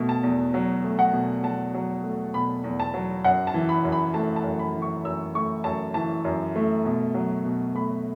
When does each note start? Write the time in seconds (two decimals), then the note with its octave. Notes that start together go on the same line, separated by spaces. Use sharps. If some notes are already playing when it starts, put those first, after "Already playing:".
Already playing: B2 A3
0.09 A5
0.23 E2
0.54 F#3
0.84 A3
0.99 F#5
1.13 B2
1.43 E2 A5
1.74 F#3
2.04 A3
2.34 B2 B5
2.64 E2
2.80 A5
2.94 F#3
3.24 F#2 F#5
3.47 A5
3.54 E3
3.69 B5
3.84 F#2
3.92 B5
4.14 A3 A5
4.36 A5
4.44 F#2
4.59 B5
4.75 E3
4.82 C#6
5.04 F#2 E6
5.35 A3 C#6
5.64 F#2 A5
5.94 E3 A5
6.24 F#2
6.55 A3
6.85 B2
7.14 F#3
7.45 B2
7.75 A3 B5